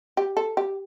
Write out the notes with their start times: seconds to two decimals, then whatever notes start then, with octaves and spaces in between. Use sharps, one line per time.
0.17 G4
0.37 A4
0.57 G4